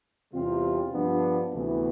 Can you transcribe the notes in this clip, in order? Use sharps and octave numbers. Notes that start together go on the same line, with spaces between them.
E2 C3 G3 C4 F4
G2 F3 B3 D4
D2 C3 E3 B3